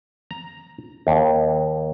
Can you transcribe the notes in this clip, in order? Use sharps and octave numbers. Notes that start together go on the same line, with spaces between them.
A#5
D#2